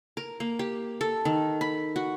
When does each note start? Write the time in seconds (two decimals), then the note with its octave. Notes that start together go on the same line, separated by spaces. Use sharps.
0.17 A#4
0.40 A#3
0.59 G4
1.01 A4
1.25 D#3
1.61 B5
1.96 F#4